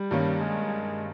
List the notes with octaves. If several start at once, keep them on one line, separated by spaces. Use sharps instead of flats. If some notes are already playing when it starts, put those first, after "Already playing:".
Already playing: G3
G2 D#3 A#3 C#4
G#3